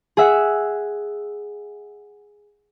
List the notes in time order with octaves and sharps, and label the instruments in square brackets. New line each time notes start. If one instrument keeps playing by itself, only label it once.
[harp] G#4 E5 F#5